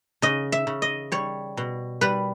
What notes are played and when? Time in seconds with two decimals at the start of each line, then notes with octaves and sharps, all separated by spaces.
0.22 C#3 D#5
0.52 E5
0.67 C#3
0.82 D#5
1.12 G3 C#5
1.57 B2
2.01 G3 B4